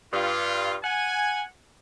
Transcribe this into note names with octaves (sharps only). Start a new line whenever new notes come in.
G2 F4
F#5 G#5